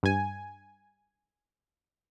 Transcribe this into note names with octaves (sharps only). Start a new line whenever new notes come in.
G2 G#5